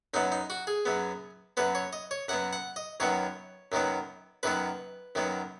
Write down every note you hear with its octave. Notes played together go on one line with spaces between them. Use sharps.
F#2 F#3 B3 D#4
D#4
F#4
G#4
F#2 F#3 B3
F#2 F#3 B3 B4
C#5
D#5
C#5
F#2 F#3 B3 F#5
F#5
D#5
F#2 D#3 F#3 B3 C#5
F#2 D#3 F#3 B3
F#2 D#3 F#3 B3 B4
F#2 D#3 F#3 B3